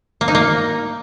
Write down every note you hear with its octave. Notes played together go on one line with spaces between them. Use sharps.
A#3
D#4
A#3